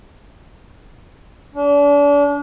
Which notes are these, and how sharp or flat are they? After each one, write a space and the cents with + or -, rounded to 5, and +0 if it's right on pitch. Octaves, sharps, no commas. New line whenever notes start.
D4 -35